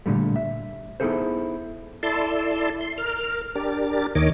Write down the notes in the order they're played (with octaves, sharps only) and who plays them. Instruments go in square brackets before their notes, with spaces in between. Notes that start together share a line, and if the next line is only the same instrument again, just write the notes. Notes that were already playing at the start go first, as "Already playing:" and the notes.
[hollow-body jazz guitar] A#2 D3 G3 A3
E5
B3 D#4 E4 G#4 A4 C5
[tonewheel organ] E4 A4 D5 A5 C6
C6
A#4 F6
D4 G4 A#4 A6
D#2 D#3 C#5 D#5 D6